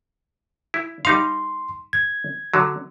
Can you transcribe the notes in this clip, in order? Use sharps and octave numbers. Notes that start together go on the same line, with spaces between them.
E4
G3 D#4 F5 C6
G#6
D3 F#3